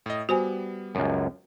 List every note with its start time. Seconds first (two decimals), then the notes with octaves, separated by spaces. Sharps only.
0.06 A2 D#5
0.29 G3 B3 F#4 C5 G#5
0.95 C#2 F#2